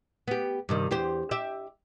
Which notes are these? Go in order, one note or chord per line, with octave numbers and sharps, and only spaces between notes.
B3 G4
G2 C3 D#3
E2 G4 C5
G4 E5